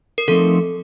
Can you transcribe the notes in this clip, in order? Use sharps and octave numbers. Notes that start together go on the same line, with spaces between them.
A#4
D3 F3 A3 C4 D#4 A4